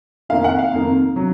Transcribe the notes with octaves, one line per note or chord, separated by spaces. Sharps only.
F1 F2 D#3 A#3 F5
F#5
F5
F1 F2 D#3 A#3
C3 F#3